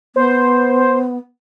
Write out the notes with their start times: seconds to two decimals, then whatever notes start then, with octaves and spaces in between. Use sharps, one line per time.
0.16 B3 C5